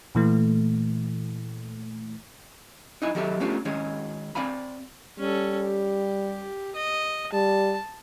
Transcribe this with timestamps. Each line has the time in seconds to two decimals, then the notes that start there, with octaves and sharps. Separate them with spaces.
0.15 A#2 E3 A3
3.02 D#4 E4 G#5
3.15 D#3 F#3 G4 A4 E5
3.40 A3 B3 C#4 D4 F4 G4
3.65 D#3 G#3 C#4 G#4
4.35 C4 D5 F5 G#5 B5
5.19 G3 C#4 A4
5.65 G4
6.75 D#5
7.33 G3 A5